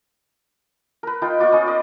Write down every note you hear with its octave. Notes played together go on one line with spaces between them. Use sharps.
A#4 B4
D#4 F4 B4 G5
B3 F4 D5 C#6
C#4 D#4 D#5
D5 D#5 C6